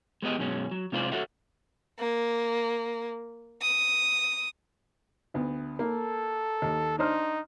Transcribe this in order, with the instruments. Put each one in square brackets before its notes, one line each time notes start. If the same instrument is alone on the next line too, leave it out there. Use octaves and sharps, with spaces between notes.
[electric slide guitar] G#3 B3 G4 D#5
F#2 B2 F#3 G#3 C#4
F#3
C3 G#3 F4 C5 D5
F#4 A4 C#5 E5 F#5
[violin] A#3
D#6
[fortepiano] D2 B3
[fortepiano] A#3 [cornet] A4
[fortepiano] D#2
[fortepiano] D4 C5 F6 [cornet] D#4